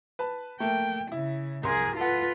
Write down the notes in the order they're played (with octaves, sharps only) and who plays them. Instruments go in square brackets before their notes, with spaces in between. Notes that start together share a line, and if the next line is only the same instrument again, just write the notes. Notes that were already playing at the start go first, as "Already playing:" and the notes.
[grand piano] B4 A5
[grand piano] A3 A#3 [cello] G5
[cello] C#3 [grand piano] E4
[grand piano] C2 C6 [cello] G#4 A#4
[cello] F4 B4 [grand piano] A4 F#5